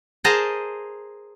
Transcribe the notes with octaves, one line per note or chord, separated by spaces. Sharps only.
G#4 A#4 C5 D#5 A5 A#5